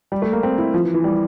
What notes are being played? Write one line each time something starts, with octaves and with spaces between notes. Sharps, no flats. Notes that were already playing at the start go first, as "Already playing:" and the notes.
G3
A3
A#3
C4
E4
F3
E3
E3
G3